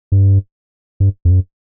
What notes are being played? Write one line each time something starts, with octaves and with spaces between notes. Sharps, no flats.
G2
G2
F2
F#2